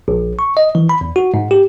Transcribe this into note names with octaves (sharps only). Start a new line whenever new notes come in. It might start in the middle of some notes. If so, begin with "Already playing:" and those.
A#1
C#6
D#5
E3
B5
E2
F#4
G#2
G4